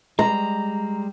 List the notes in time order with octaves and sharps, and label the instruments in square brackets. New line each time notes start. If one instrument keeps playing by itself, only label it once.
[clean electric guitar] G3 G#3 [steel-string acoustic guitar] A#5